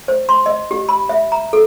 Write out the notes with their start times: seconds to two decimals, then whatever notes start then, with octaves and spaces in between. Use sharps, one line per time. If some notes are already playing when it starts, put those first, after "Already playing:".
0.08 C5
0.29 C6
0.46 D#5
0.71 G4
0.89 B5
1.09 E5
1.32 A#5
1.53 A4